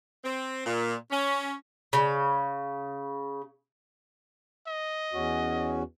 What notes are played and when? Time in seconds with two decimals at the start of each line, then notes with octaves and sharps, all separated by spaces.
0.24 C4
0.66 A#2
1.11 C#4
1.93 C#3 F5
4.68 D#5
5.13 E2 C#4 F#4